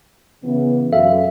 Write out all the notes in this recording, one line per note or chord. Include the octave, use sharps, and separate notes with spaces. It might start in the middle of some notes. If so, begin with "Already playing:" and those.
C#3 E3 B3
F#2 A4 E5 F5